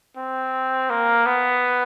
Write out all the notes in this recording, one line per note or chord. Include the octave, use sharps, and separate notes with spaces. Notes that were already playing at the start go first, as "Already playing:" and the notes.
C4
A#3
B3